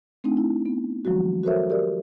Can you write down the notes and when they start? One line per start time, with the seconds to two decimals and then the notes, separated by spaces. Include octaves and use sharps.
0.24 A3 C4 D4 D#4
0.37 E4
0.66 B3
1.05 D#3 F3 F#3 G#3 F#4
1.44 F#4 A4 A#4 C5 C#5 E5
1.70 G4 A#4 D5